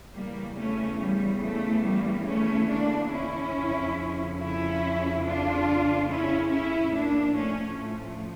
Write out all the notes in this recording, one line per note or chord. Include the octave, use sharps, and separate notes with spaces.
E2 C#3 E3 G3 A#3
A3 C#4
G3
A3
G3 A#3
A3 C#4
A#3 D4
C#4 E4
F2 C#3 F3
C#4 E4
D4 F4
C#4 E4
C#4 E4
A2 F3 A#3 D4
A3 C#4
A3